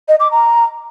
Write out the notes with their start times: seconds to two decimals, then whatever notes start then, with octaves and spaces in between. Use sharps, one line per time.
0.08 D#5
0.20 D6
0.31 A#5